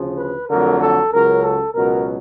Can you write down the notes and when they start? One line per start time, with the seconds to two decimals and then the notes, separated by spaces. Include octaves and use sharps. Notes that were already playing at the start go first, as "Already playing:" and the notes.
Already playing: D2 C#3 F3
0.18 B4
0.50 F2 D3 F#3 A3 A#4
0.81 A4
1.12 C#2 C#3 F#3 A#4
1.43 A4
1.75 C#2 B2 F#3 A#4